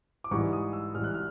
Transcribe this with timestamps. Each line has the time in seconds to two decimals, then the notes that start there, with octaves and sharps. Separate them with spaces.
0.24 D6
0.31 G#2 E3 G3 C#6
0.53 D#6
0.73 E6
0.95 G#2 E3 G3 F6
1.04 F#6
1.14 F6